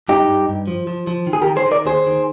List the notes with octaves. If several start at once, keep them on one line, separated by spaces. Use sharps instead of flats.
G2 D#4 G4
G2
G2
F3
F3
F3
D#3
G#4
G4 A#4
D#3
G#4 C5
D#3
A#4 D5
D#2 G#4 C5
D#3